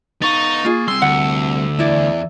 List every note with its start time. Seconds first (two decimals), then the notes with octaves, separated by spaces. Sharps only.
0.22 B3 D#4 F5 C#6 A6
0.65 A#3 F4 G#4
0.88 G3 C4 C6 E6
1.02 D2 F#5
1.79 E2 E4 D5